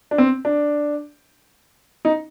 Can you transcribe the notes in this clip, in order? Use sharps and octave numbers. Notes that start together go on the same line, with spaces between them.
D4
C4
D4
D#4